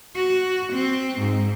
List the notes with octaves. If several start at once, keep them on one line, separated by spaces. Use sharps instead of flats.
F#4
C4
G#2